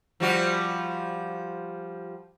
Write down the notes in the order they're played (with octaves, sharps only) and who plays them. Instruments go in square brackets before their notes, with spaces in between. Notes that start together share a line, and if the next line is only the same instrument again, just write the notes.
[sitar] F3 G3 F#4